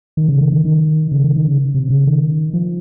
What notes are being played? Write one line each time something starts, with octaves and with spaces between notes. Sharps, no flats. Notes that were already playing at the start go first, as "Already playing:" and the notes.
D#3
C#3
D#3
D#3
D#3
C#3
D#3
D#3
C#3
C3
C#3
D#3
F3